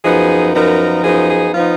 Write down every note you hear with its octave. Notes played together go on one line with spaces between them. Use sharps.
F#2 F3 B3 D#4 G#4
F#2 F3 B3 D#4 A#4
F#2 F3 B3 D#4 G#4
G#4
F3 B3 D#4 F4